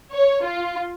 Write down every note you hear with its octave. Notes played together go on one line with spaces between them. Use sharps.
C#5
F4